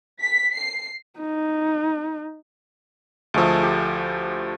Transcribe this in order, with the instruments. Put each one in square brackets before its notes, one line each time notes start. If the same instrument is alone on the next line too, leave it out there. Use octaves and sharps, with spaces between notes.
[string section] B6
C7
[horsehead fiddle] D#4
[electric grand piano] D2 F3 [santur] G#3 A3 E6
[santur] G4